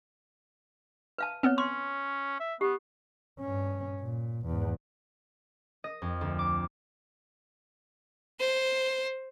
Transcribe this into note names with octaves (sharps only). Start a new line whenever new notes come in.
B4 F5 A5
B3 C4 B4 C#5
C#4 C6 C#6
E5
B3 G4
G2 C#4
A#2
E2 G#2
D#5
F2
D2
D6
C5